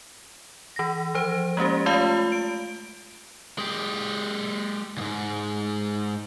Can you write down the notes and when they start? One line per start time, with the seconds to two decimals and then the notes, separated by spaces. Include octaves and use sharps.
0.76 E3 A#6
1.15 F3 C5
1.57 G#3 A#3 C#4 G4
1.86 A3 F4 F5
2.32 D7
3.58 G#3 G4
4.97 D2 G#2